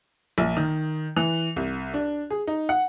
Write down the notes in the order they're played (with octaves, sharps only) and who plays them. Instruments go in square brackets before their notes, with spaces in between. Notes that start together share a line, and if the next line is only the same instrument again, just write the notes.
[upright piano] A#1
D#3
E3
C2
D4
G#4
D#4
F#5